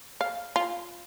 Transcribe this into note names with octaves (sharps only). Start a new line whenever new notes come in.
F5
F4